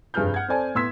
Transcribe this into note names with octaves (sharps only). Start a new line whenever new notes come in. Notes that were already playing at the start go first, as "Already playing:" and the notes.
F1 G2 G#4 B4 F6 G6
F#5 G#6
C4 A4 C5 D5 G#5 A5
A2 B3 C6 E6 G#6 B6